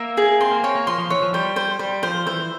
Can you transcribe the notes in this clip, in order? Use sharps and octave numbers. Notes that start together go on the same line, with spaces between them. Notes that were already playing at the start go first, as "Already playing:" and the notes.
Already playing: A#3 E5
G#4
C4 C6
A#3
C4 C#5
A#3
F3 C6
F3
E3 C#5
F3
G3 C5
C5
G3 C5
F3 C5
E3 C5